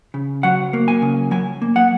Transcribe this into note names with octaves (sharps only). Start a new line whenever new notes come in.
C#3
F#3 F#5
A#3
G#5
C#3
F#3 G#5
A#3
F#5